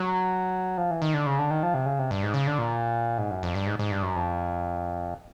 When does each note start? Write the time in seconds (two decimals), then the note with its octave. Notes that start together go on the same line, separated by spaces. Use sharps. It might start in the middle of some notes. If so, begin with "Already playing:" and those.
Already playing: F#3
0.77 F3
0.91 E3
1.02 D#3
1.14 D3
1.26 C#3
1.39 D3
1.50 D#3
1.63 F3
1.74 C3
1.86 C#3
1.99 C3
2.11 G2
2.23 G#2
2.34 C#3
2.47 D3
2.59 A#2
3.18 G#2
3.31 F#2
3.43 F2
3.55 G2
3.66 G#2
3.79 G#2
3.91 G2
4.02 F#2
4.15 F2